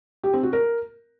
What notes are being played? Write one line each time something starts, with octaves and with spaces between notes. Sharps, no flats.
G4
C4
F#4
A#4